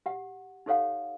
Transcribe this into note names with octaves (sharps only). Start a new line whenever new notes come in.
G4 F#5
D#4 G4 A4 C#5 F5 F#5